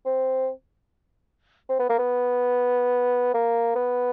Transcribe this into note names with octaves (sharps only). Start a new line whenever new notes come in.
C4
C4
B3
A#3
B3
A#3
B3